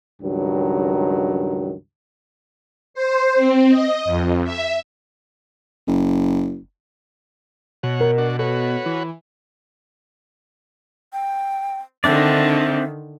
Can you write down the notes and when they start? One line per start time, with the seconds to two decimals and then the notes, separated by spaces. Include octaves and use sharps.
0.23 C#2 G2 D#3 F#3
2.94 C5
3.35 C4
3.70 D#5
4.05 F2
4.44 E5
5.88 F#1
7.83 B2 C#5 F#5
8.00 A#4
8.18 D4 F#4
8.39 F#4 A4 B4 C#5
8.86 E3
11.13 G5
12.04 D3 D#3 C4 D4 D5 E5